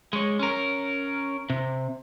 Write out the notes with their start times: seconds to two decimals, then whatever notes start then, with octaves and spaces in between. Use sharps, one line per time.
0.13 G#3 C#5
0.39 C#4 A#4
1.50 C3